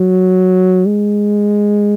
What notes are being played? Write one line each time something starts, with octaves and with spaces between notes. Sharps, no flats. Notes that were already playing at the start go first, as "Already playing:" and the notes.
Already playing: F#3
G#3